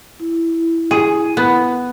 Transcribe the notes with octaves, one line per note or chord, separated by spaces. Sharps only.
E4
G#4
B3